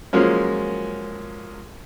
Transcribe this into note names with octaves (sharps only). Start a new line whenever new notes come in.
F3 F#3 G#3 A#3 C#4